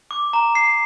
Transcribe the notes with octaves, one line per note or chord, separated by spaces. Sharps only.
D6
A#5
C7